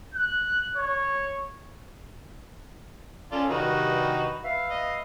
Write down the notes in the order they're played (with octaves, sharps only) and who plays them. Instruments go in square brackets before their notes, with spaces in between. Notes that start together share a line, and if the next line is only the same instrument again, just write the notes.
[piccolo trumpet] F#6
C#5
[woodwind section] C#4 [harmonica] F4 A4 D5
[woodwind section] G2 C3 D#3 [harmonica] D#4 F#4 B4
[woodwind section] B4 E5 F5
[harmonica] D#5